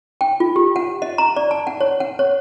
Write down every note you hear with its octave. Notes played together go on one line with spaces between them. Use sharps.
G5
F4
G4
F#5
D#5
A#5
D5
A5
F#5
C#5
F#5
C#5